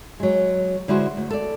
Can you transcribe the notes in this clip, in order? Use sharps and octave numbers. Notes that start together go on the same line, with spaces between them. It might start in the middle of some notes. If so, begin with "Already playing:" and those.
F#3 G#3
D3 G#3 E4 F#4 G#4 C5
D2
A4 D5